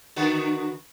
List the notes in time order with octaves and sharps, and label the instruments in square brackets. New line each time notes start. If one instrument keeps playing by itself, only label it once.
[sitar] D3 F#4 B4